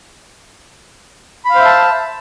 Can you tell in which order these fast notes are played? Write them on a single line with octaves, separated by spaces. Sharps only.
B5 F5 C5 E5 A5